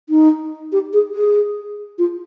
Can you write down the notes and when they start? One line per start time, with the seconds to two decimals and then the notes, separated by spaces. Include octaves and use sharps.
0.09 D#4
0.72 G4
0.93 G#4
1.15 G#4
1.98 F4